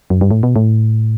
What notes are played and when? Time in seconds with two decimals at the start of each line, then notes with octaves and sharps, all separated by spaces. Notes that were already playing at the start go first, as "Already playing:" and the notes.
0.10 F#2
0.21 G2
0.31 A2
0.43 B2
0.56 A2